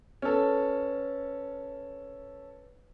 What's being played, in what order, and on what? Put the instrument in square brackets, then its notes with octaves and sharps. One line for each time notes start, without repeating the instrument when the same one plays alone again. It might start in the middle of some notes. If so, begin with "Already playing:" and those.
[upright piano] C#4 A4 [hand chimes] B4 F6